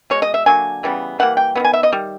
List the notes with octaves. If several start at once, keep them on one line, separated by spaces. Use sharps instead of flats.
B2 G#3 C#5
D#5
E5
D3 F#3 A#3 G#5
C#3 E3 G3 B3
E3 G3 A#3 F#5
G5
D#3 F#3 B3 G#5
E5
D#5
D#3 G3